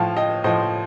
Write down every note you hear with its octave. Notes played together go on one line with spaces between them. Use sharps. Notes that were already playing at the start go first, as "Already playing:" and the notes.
Already playing: A2 F3 F5 A5
D#5 G5
A2 F3 C5 D#5